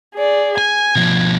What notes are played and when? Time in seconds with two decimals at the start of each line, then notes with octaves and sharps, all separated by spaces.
0.15 G#4 D5
0.58 G#5 G#6
0.95 B2 F3